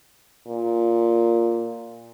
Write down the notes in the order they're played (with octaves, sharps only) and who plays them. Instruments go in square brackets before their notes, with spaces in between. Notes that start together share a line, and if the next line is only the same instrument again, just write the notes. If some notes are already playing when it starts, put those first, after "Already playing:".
[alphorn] A#2